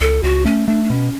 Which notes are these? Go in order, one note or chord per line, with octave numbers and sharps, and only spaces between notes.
C#2 A4
C#2 F#4
A3 C#4
A3 D4
D4
B2 C#4